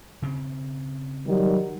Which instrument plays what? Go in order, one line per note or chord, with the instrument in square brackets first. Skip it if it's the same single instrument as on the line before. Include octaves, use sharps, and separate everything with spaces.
[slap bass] C#3 C4
[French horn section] D#3 F#3 G3